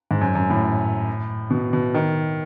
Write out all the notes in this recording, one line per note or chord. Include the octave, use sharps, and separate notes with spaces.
G#2
F#2
F#2
A2
B2
B2
D#3